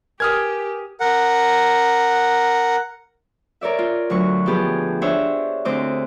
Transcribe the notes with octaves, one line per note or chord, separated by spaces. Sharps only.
G4 A#4 B4 G#5 D#6 F6 G#6
A#4 F#5
A#4 C#5 D5 E5
F4
D2 F#3 C#6
F3 B3 G4 G#4 B4
D4 C5 C#5 E5
D2 C4 C5 D#5 D6